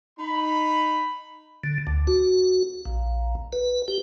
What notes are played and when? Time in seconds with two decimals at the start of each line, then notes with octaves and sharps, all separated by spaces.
0.19 D#4 B5
1.63 D3
1.87 D2
2.07 F#4
2.85 A#1
3.53 B4
3.88 G4